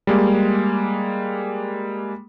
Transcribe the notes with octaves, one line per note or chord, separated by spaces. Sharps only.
G3 G#3 A#3